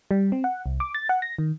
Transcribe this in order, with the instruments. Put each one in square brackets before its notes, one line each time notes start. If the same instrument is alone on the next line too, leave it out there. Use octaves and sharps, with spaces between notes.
[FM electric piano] G3
C4
F#5
C2
D6
A6
F#5
A#6
D#3